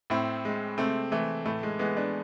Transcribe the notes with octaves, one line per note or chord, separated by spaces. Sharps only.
A2 C4 E4
G#3
C3 A3 C4
E3 A3
A2 A3
G#3
E3 G#3 B3
B3 D4